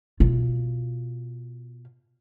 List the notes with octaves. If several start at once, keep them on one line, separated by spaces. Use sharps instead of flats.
B2 F4